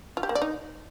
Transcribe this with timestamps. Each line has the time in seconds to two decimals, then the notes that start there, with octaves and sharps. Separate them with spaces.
0.17 F4
0.23 G4
0.29 A#3
0.35 D5
0.42 D#4